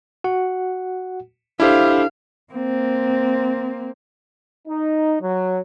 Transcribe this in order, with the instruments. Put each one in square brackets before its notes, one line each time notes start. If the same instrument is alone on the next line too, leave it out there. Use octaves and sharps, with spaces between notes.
[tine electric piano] F#4 F#5
[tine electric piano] D4 A4 [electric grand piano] E4 G4 C5 [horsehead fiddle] F5
[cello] A#3 C4
[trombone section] D#4
F#3